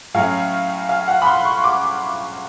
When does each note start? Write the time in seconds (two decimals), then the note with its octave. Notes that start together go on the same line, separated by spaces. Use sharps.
0.14 A2 F#3 A3 C#4 F5
0.89 F5
1.08 F#5
1.22 B5
1.27 C6
1.45 C#6
1.64 D6